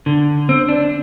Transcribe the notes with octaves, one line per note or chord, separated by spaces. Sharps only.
D3
C4
D4